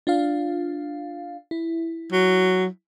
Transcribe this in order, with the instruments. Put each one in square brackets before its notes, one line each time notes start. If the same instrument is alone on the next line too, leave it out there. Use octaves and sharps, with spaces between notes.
[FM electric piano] D4 F4 F5
E4
[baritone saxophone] F#3